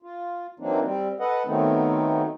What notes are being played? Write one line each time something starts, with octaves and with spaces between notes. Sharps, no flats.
F4
E3 F#3 A#3 C4 D4 D#4
G3 C4
A4 B4 D#5 F#5
D#3 F#3 A3 B3 C4 D#4